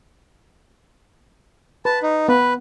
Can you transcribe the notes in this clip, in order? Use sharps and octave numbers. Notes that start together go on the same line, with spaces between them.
B4 A5
D#4
B3 B4